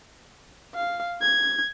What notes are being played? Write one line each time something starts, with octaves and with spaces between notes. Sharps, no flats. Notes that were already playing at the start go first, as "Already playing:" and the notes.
F5
G#6